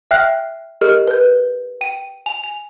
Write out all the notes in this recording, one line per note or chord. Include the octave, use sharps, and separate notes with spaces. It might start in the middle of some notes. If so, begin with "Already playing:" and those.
E5 G5 F6 F#6 C7
G4 A4 A#4 D#5 F6
B4 G6
G5 D#7
G#5 F7
F7